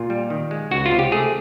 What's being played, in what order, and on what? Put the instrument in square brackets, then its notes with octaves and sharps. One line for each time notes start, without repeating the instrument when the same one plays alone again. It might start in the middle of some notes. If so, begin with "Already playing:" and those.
Already playing: [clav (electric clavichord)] A#2 F4
G3
D#3
G#3
C#2 F#4
F4
C3
G4
A3 G#4